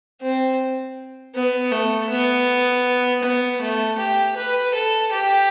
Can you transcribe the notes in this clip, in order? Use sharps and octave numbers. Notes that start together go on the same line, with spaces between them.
C4
B3
A3
B3
B3
A3
G4
B4
A4
G4